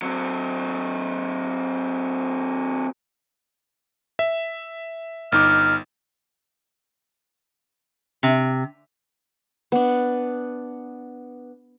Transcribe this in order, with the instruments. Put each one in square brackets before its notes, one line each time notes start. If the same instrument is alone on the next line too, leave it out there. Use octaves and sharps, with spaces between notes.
[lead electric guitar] F#3 C4
[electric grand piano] E5
[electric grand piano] G1 D#4 D6 [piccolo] F6
[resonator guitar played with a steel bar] C3
[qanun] B3 D4